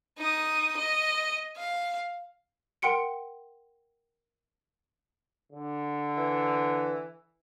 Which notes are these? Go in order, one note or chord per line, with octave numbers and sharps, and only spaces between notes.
D#4 D#6
D#5
F5
A#4 F#5 G5 C6 C#7 D7
D3
E3